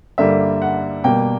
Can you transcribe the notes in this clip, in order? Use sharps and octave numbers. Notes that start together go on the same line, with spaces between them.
G2 D3 G3 A#3 E5
F#5
B2 G3 A#3 G5